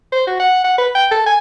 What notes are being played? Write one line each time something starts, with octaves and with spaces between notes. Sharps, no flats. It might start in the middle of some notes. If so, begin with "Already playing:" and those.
C5
F#4
F#5
F#5
B4
G5
A4
G#5